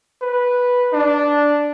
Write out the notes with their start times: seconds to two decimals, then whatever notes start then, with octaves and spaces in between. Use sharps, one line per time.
0.22 B4
0.93 D4